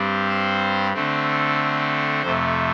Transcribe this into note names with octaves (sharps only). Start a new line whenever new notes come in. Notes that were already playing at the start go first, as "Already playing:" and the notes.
Already playing: G2 G3 C4
C5
D3 A3 C4
F2 C3 A3 C5